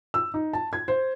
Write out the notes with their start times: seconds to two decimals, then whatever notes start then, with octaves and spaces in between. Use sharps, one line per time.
0.14 E6
0.34 D#4
0.53 A5
0.73 G#6
0.88 C5